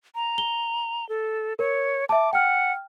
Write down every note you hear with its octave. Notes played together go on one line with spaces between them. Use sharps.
A#5
G7
A4
A#4 C#5
E5 A5 D6
F#5 G5 F6